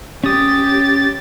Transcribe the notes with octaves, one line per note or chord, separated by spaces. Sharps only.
C#4 G4 D#6 A6